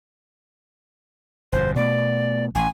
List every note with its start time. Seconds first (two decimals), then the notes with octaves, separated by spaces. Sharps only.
1.52 G1 F2 B2 C5
1.76 B2 A3 D5
2.55 A1 G#5